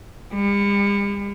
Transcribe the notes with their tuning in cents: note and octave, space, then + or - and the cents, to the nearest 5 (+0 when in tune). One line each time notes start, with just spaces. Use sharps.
G3 +45